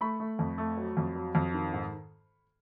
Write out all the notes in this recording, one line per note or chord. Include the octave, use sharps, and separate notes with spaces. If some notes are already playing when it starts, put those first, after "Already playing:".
A3 B5 C#6
A3
F2
A3
F#3
F2
F#3
F2
D#3
G#2